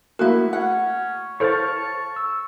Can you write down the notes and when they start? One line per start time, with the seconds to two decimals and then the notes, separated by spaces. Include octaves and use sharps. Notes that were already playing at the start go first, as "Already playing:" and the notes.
0.19 A3 A#3 E4 F#4 A#4
0.53 C#4 F#5
1.40 E4 A4 C5 C#5 F5 A5 C#6
2.16 E6